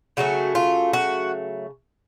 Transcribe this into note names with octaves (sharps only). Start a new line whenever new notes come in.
C#3 F#3 A3 F#4
F4
F#4